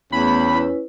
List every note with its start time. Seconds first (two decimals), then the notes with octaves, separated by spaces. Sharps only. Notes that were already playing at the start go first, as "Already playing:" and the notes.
0.12 E2 A3 B3 C#4 B5
0.50 E4 B4